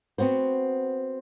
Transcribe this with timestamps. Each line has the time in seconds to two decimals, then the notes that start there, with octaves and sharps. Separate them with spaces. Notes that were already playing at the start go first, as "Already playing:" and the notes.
0.18 B3 C4 F#4 C5